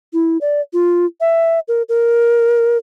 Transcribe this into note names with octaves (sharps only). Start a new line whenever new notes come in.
E4
D5
F4
E5
A#4
A#4